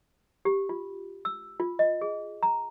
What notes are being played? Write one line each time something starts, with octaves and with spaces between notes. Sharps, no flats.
G4
F4
E6
F4
D#5
G#4
A#5